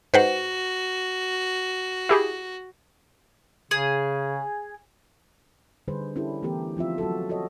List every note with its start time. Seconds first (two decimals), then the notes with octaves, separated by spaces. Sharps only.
0.14 G#2 F#4 B4 C5 F#5
2.09 E4 G4 G#4
3.71 C#3 G#4
5.88 D3 G3 D#4 G#4 B4 C5
6.16 C#4 D4 E4 G4 A4
6.43 E3 A3 B3 G4 A#4
6.77 F3 C4 F4 E5
6.98 F#3 F#4 A4
7.29 F#4 A4 C#5 D#5